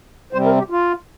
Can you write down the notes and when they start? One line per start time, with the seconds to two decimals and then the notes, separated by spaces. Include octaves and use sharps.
0.33 C3 G3 C4 C5
0.45 A#4
0.58 G4
0.70 F4